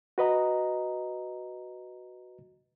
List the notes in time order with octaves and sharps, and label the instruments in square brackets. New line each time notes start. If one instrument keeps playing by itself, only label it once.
[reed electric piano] F#4 B4 D#5 A#5